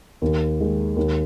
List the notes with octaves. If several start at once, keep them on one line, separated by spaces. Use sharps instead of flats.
D#2
D#3 G#3
D#2